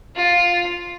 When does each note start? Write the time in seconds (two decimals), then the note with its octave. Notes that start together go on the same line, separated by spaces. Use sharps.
0.15 F4